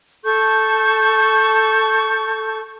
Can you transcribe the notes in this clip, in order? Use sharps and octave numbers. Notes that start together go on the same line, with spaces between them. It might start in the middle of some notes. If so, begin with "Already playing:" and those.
A4 A5 C#6 G6